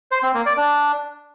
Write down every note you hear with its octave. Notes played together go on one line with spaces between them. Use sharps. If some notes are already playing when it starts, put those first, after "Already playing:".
C5
C4
A#3
D5
D4